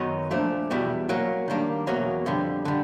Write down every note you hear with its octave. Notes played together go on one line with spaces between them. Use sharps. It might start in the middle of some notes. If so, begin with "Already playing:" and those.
Already playing: F#2 D#3 F#3 B3 D#4
A#2 F3 A3 D4
E2 B2 G3 B3 E4
F#3 A#3 C#4
D#3 G3 A#3 D4
E2 B2 F#3 A#3 C#4
F2 D3 G3
D3 G3